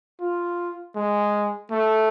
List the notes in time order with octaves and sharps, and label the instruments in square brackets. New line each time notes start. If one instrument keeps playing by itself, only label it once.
[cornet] F4
G#3
A3